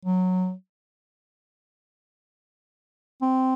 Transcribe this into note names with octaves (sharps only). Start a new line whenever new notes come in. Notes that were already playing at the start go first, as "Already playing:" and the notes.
F#3
C4